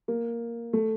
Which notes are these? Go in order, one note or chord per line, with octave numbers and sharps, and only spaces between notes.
A#3
A3